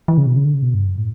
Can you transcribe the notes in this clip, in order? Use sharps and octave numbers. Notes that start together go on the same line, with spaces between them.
E3
C#3
B2
C#3
D3
C#3
B2
G2
F#2
A2